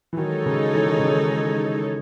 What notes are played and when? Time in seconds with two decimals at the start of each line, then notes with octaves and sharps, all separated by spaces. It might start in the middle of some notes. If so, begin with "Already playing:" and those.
0.13 E3
0.17 D#3 F#3 G#3 D#4 A4 C#5
0.46 C#3
0.75 E3
0.86 D#3
0.99 C#3
1.11 D#3